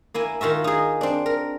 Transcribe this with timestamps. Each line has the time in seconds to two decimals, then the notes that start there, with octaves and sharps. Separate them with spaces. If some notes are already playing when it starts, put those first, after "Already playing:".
0.14 A#3 E4 G#5
0.41 D#3 F4 F#4 E5
0.64 D#4 G#4
1.01 C4 D4
1.26 A#4